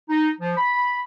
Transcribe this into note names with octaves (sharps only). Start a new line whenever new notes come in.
D#4
F3
B5